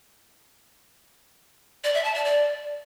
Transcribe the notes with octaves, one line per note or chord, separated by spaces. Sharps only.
D5
E5
A5
D5
D5